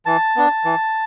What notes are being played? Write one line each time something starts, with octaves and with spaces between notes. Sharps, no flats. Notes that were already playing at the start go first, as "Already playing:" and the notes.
E3 A5
B3 D4
E3